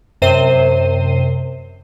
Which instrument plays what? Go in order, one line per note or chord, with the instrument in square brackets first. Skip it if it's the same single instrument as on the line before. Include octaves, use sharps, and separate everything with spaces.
[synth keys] F#2 C3 C5 C7 D#7